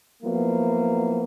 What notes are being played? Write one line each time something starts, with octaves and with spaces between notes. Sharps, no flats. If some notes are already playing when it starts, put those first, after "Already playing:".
F3 F#3 A#3 B3 E4